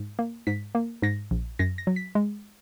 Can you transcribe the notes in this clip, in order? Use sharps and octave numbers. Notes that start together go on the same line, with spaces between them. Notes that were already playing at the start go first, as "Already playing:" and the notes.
Already playing: G#2
A#3
G#2 B6
A#3
G#2 A#6
A#1
F#2 A#6
A#6
F#3
B6
G#3